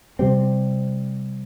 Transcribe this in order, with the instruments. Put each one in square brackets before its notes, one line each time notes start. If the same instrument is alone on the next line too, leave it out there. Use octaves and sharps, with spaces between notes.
[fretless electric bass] C3 G3 C4